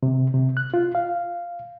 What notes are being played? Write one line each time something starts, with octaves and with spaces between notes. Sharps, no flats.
C3
C3
F#6
F4
F5